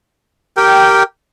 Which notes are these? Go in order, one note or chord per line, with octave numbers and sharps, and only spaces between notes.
G4 A#4 G5